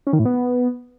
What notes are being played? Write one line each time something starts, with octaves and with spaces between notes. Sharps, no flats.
C#4
D#3
A2
B3